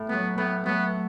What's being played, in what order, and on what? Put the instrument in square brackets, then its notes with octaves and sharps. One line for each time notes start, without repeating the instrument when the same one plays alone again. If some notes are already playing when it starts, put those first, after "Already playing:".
Already playing: [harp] A2
[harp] F#3 A3 [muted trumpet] B3
[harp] A2 [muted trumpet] B3
[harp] F#3 A3 [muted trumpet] B3